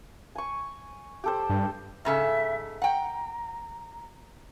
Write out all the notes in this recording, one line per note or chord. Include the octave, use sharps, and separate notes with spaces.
G#5 C#6
G4 A4 C5
G2
G#2 C#3 A4 E5
F#5 G5 A#5